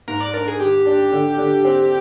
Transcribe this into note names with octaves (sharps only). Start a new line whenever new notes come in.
G#2 A#4
D5
D4 A#4
G#4
D#3 G4
D4
D3
D3
C4